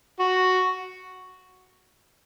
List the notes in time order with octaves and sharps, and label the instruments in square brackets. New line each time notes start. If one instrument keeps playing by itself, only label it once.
[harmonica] F#4